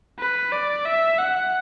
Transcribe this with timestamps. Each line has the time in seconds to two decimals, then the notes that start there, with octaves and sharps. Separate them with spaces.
0.19 B4
0.52 D5
0.86 E5
1.18 F#5